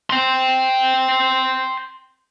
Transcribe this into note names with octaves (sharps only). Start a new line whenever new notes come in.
G5 C6